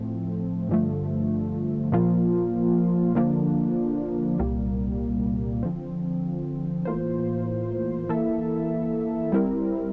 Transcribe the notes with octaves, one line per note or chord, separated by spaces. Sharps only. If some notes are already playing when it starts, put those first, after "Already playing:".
Already playing: A2 F3 A3 C4
G2 D3 F3 A3
A#2 F3 A#3 F4
D3 F3 A#3 D4
C2 A#2 G3 A#3
D3 F3 C4
A2 E3 A#3 F4 C5
E3 A#3 E4 A4 E5
G3 C4 E4 A#4